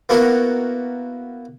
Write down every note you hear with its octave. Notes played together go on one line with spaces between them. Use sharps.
A#3 B3 E4 F#4 A#4